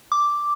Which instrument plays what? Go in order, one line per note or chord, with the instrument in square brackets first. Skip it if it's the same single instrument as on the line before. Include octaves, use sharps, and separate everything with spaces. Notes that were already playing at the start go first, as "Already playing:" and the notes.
[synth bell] D6